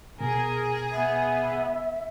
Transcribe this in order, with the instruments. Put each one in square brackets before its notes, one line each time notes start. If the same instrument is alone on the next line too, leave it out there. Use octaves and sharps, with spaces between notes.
[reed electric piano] B2 [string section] G#4 [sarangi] A#4
[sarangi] B3 [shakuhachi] E5